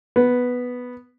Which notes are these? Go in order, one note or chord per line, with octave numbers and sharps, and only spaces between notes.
B3